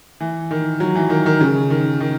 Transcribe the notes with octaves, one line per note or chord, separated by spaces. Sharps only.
E3
D#3
F#3
E3
D#3
D#3
C#3
D#3
D#3